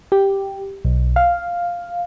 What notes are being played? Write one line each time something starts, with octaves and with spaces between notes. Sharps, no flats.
G4
B1
F5